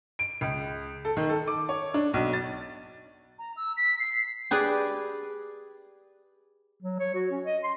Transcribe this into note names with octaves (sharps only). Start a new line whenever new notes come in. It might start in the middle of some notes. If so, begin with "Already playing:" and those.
D7
C#2
A4
D#3
A4
D6
C#5
D4
B1
A6
A#5
E6
B6
C7
G4 G#4 B4 D5
F#3
C#5
F#4
C#4
D#5
C6